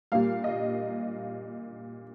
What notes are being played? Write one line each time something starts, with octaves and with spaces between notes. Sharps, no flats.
A#2 G3 A#3 F5
D#5